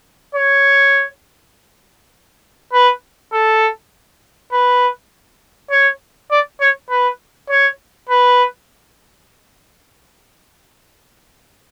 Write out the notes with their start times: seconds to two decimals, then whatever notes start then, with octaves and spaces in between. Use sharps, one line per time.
0.35 C#5
2.73 B4
3.33 A4
4.53 B4
5.71 C#5
6.31 D5
6.61 C#5
6.90 B4
7.50 C#5
8.09 B4